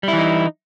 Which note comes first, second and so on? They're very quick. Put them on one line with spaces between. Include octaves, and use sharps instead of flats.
G3 E4 E3 D#4